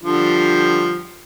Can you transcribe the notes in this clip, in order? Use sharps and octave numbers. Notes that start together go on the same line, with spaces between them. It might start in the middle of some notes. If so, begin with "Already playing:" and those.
D3 F3 G3